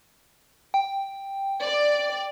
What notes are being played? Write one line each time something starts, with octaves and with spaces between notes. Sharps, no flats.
G5
D5